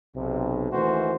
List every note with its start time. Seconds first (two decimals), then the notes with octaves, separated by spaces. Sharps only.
0.15 B1 C3
0.71 D#2 E3 A3 C#4 F#4 C5